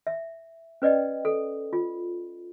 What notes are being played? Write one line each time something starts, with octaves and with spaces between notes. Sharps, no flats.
E5
C#4 B4 D5 D#5 G5
A4
F4